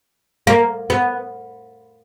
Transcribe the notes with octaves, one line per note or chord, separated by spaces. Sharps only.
A#3
B3